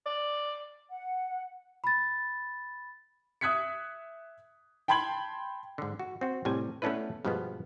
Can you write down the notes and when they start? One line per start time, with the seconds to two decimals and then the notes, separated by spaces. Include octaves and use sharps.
0.06 D5
0.89 F#5
1.84 B5 A6
3.41 E5 D#6 F#6 G#6 B6 C#7
4.88 G5 A5 B5 C6 G#6 F#7
5.78 G#2 D3
6.00 F#4
6.21 C4 F#4
6.45 A2 C3 G3 G#5
6.82 A3 B3 C#4 D4 E4 B4
7.25 G2 B2 F3 G#3 B3